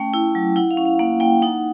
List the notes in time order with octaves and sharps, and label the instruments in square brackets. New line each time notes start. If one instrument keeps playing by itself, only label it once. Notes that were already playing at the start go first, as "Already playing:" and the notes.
Already playing: [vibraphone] A3 C#4 G5
E4
F#3
E4 F#5
F5
C#4
F5
A#3 F#5
A#3 G5
D#4 F#5